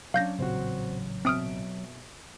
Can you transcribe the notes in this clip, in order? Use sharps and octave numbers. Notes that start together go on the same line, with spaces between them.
F#3 C#4 D4 F5 G6 A#6
A1 A#2 C#3 C4 F#4
B2 C4 E5 D#6 F6 D7